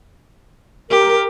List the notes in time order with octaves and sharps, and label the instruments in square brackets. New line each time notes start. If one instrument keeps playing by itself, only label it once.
[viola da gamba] G4 [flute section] A#4